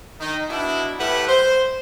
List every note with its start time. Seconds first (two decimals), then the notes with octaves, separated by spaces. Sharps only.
0.20 D#3 D#4
0.49 B2 D4 E4
0.99 A2 G3 G4 B4 E5 F#5
1.28 C5